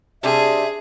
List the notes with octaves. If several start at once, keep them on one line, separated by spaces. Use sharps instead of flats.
C3 G3 D4 G#4 E5